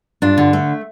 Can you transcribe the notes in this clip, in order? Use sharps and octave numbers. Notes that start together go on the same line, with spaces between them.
G2 D4 F4
D3
A3